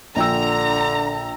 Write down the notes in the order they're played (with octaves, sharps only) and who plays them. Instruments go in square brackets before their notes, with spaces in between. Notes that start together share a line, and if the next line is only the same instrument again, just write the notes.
[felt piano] A#1 G5 E6 [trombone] D3 [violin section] A#5